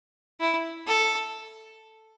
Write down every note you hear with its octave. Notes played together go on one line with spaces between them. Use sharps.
E4
A4